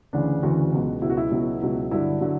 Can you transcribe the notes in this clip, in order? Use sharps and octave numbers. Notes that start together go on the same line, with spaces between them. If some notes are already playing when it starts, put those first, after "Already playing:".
D2 C#3 E3 D4
D2 C#3 E3 F#4
C#2 B2 F#3
C#2 B2 F#3 E4
F#4
E4
C#2 B2 F#3
C#2 B2 F#3
G2 D3 F#3 E4
D3 F#3